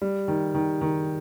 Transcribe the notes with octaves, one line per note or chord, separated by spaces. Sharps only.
G3
D#3
D#3
D#3